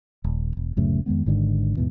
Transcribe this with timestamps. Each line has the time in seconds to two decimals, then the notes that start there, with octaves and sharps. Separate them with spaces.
0.24 D#1
0.57 E1
0.76 D1 F#2 C#3 A3
1.06 F2 D#3 G#3 B3
1.26 G#1 G#2 D3 D#3
1.76 D#2 G#2 B2 E3